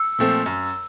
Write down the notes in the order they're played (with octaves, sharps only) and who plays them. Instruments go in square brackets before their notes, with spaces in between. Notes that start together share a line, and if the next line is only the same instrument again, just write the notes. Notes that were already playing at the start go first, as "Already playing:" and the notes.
Already playing: [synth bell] E6
[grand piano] A#2 F3 A3 C4
F#2